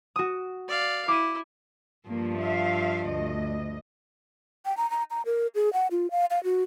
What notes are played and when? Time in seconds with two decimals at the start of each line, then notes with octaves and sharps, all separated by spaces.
0.16 F#4 D#6
0.68 D5 F5
1.08 E4 D6 D#7
2.09 G2 F3 A#3
2.39 E5 F5
3.06 D2 D#5
4.65 G5
4.77 A#5
4.91 A#5
5.10 A#5
5.26 A#4
5.55 G#4
5.73 F#5
5.91 F4
6.11 F5
6.31 F5
6.44 F#4